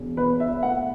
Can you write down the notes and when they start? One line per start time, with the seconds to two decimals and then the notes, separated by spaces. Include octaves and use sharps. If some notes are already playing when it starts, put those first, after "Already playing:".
Already playing: E1
0.17 E2 B4
0.40 E5
0.63 A3 F#5